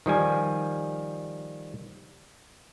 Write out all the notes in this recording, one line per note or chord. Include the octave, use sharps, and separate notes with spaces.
D#3 F3 G3 G#5